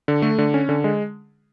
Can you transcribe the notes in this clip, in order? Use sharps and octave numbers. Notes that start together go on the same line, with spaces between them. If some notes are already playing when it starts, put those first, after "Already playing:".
D3
A3
D3
C#4
D3
G#3